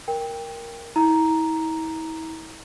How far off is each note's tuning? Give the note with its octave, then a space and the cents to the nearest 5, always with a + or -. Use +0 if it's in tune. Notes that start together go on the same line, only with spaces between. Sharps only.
A#4 +0 G5 +15
E4 -40 A#5 +0